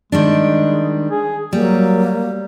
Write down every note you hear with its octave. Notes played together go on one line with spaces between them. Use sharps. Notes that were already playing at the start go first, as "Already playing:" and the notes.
D#3 G3 G#3 D4
G#4
F#3 G3 A#3